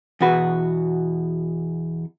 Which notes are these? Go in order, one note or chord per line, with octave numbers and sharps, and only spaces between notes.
E2 B2 F#4 B4